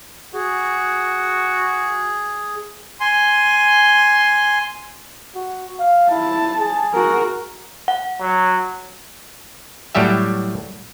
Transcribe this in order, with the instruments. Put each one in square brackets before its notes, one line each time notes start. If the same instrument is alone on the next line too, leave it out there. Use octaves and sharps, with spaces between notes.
[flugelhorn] F#4 [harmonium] G#4
[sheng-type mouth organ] G#5 C6
[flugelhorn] F#4
F5
[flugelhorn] E4 [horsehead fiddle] A5
[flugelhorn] G#4
[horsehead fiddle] F#4 A#4
[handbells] F#5
[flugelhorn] F#3
[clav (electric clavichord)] A2 F#3 G3 G4 E5